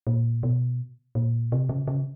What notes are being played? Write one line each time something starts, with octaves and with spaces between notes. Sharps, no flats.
A#2
B2
A#2
C3
C#3
C#3